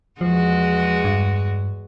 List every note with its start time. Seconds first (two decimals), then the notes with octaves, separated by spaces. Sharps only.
0.21 E2 F3 G#3 F#4
1.04 G2